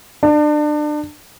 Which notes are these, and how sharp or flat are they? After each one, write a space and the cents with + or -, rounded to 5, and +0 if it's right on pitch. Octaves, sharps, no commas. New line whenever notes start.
D4 +30